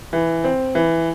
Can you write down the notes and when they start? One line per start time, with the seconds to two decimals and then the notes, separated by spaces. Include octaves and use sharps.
0.13 E3
0.44 C4
0.75 E3